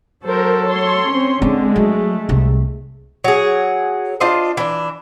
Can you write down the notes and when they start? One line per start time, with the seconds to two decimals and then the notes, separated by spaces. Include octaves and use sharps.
0.25 F#3 A4 A#4 C5
0.67 C#5 C6
1.08 C4 C#4
1.42 D3 G#3 C4
1.76 F#3 A3
2.29 C2 C3
3.24 F#3 G#4
4.20 D4 F4 C5 D#5
4.57 E3 D4